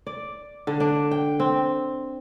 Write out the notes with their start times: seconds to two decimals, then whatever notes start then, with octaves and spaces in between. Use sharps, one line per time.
0.07 D5
0.67 D3
0.80 D4
1.11 G5
1.40 C4